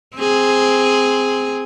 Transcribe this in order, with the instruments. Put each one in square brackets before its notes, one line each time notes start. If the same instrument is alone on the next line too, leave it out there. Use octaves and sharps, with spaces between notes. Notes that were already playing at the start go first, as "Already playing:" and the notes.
[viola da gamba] C4 G#4